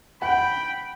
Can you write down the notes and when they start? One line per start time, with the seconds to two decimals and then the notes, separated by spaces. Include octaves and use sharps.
0.22 F#5 G5 B5